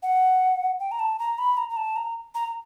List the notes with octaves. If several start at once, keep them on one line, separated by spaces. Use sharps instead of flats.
F#5
G5
A#5
A5
A#5
B5
A#5
A#5
A5
A#5
A#5